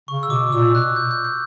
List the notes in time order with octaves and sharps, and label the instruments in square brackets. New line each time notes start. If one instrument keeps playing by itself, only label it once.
[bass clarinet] C#3 [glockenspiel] C#6
[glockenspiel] E6
[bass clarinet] B2 [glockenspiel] D6
[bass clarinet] A#2 [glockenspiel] E6
[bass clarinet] B2 [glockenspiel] F#6
[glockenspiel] G6
G6
G6